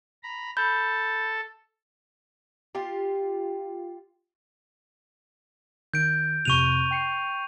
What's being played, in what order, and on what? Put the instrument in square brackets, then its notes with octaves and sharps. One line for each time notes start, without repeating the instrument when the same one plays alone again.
[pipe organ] A#5 B5
[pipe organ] A4 A5 [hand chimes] B5 G6
[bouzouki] F4 G4
[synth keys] D#3 [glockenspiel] G6 D7
[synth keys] F2 C3 F#6 [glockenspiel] C#6 D#7 F7
[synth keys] G5 C7 C#7